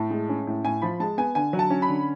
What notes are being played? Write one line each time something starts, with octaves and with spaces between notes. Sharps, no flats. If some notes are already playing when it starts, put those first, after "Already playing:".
Already playing: A2 A5
G#3
C#4
A2
A2 G#5
F3 B5
G#3 A5
B3 G#5
D3 G#5
F#3
A5
C#4
B5
D3